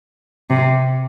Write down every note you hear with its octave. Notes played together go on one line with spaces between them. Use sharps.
C3